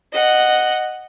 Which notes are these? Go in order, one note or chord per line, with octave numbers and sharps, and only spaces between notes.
D#5 F#5